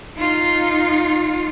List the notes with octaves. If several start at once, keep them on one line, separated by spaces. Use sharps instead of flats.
D#4 F4